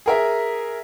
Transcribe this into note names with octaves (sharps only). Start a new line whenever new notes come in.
G#4 A#4 E5